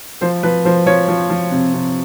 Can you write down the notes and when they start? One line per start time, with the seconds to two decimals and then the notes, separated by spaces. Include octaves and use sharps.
0.21 F3 C5
0.43 F3 B4
0.65 F3 C5
0.86 F3 C#5
1.08 F3
1.30 F3
1.52 C3
1.74 C3